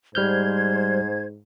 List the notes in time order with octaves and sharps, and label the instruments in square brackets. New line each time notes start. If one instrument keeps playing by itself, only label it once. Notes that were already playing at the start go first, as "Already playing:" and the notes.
[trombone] G#2 [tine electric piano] G3 F6 G6 [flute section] C5 G#6